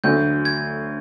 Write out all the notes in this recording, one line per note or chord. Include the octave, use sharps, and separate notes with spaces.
D2 D3 F#3 G6
G#6